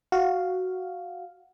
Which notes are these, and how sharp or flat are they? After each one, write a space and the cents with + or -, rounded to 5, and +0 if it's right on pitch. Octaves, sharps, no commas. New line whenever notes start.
F#4 +0 F5 +0